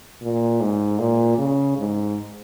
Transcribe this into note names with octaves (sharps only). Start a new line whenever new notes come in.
A#2
G#2
A#2
C#3
G#2